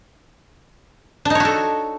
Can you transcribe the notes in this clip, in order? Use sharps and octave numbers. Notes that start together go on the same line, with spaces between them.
D4 D#4 F#4 A4 C#5